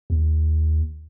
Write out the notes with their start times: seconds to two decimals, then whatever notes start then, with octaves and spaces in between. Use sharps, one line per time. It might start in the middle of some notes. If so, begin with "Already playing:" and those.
0.10 D#2